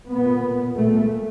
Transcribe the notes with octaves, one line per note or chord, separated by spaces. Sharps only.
A#2 B3
A#2 A3